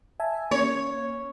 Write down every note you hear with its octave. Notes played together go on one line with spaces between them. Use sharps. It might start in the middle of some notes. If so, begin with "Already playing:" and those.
E5 G#5 A5
A#3 C#4 C#5